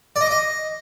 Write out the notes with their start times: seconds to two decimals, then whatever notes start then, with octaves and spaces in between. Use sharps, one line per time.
0.16 D5
0.21 D#5
0.26 D6
0.31 D#5